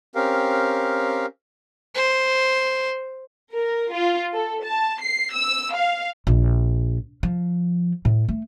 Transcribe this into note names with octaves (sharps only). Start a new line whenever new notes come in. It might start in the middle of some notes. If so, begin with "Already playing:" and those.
C4 C#4 G4 A#4 F5
C5
A#4
F4
A4
A5
C7
E6
F5
A#1
F3
A2
A3